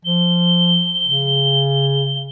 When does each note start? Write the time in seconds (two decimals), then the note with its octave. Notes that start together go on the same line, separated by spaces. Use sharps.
0.05 F3 G7
1.06 C#3